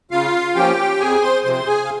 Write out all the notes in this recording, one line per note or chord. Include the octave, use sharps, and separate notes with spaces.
C#3 F4 F5
F3 A#3 C#4 G4 G5
F2 G#4 G#5
C5 C6
C3 F3 C4 C5 C6
G#4 G#5
F5